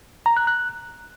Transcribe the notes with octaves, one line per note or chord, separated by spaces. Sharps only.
A#5
F#6
F#6